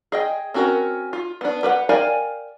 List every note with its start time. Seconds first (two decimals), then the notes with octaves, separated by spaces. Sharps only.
0.12 G#4 D#5 G5
0.54 C4 C#4 F#4 A4 A#4
1.13 F4
1.41 B3 D4
1.63 G4 B4 D5 F#5
1.89 A#4 D5 F5 G5 G#5